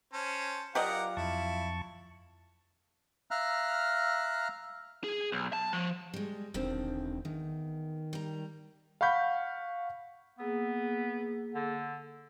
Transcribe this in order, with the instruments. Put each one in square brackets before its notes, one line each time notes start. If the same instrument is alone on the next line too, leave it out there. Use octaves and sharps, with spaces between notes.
[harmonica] C#4 C5 A5
[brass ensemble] F#3 F4 F5 [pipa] G4 D5 D#5 [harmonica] A#4 F#5
[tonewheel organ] F2 A5 C#6 [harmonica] E4
[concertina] E5 F5 A#5 F6 F#6
[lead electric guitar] G#4
B1
A5
F3
[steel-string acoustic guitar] G3 G#3
[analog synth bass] E1 [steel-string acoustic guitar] D3 D#3 C4
[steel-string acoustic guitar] E2 [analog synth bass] D#3
[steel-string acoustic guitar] G3 A#5
[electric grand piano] F5 F#5 B5 C#6 G6 B6
[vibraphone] A#3 G#4 E6 [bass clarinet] B3
[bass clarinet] D3